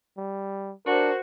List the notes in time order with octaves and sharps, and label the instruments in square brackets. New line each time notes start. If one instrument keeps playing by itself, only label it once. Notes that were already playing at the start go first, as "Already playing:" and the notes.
[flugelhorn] G3
[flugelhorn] D4 [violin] F#4 C5 [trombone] A#4